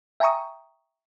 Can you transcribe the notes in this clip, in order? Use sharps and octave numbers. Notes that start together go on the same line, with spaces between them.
E5 G5 G#5 A#5 C#6 D#6